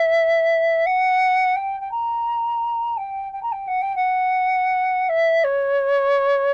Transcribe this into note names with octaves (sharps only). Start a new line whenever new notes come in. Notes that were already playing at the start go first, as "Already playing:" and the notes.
Already playing: E5
F#5
G5
G5
A#5
G5
G5
A#5
G5
F#5
G5
F#5
E5
C#5